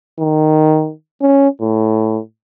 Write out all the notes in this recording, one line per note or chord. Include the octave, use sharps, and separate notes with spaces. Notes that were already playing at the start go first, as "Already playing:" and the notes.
D#3
C#4
A2